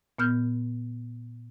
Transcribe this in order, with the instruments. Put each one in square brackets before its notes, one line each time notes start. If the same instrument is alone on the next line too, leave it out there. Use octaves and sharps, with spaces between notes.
[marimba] A#2 B3 F6 G6